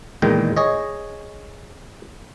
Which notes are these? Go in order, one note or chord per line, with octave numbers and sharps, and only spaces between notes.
E2 A#2 D#3 G#3 G5
G#4 C#5 D#5